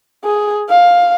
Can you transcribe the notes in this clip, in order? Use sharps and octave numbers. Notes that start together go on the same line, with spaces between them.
G#4
F5